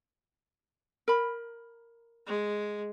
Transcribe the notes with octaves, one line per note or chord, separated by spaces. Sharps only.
A#4 B5
G#3